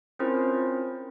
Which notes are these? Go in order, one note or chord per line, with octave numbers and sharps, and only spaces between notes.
C4 C#4 E4 F4 A#4 C5